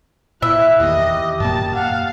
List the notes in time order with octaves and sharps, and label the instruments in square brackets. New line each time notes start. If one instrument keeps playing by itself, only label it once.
[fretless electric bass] A#2 [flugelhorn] E4 [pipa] E5 [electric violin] F#6
[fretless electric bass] E2 D#3 [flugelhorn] G4 [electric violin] D#5
[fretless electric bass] F#2 A#2 A#3 [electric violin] A5
[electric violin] F5 [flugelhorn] F#5